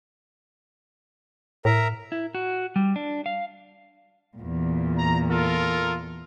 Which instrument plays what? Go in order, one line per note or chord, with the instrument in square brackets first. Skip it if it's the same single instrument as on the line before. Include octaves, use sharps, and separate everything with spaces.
[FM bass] A2 [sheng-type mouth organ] A#4 E5 A#5
[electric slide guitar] E4
F#4
G3
D4
F5
[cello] E2 A#2
[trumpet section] A#5
F4 A4 A#4